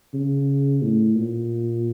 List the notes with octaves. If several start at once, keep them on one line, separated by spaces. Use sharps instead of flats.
C#3
A2
A#2